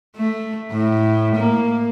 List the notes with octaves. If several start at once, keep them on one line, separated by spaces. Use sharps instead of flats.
A3
A2
A#3